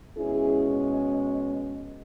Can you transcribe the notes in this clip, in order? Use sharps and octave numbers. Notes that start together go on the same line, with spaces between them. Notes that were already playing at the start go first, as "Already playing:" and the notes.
B2 G#3 C#4 E4 G#4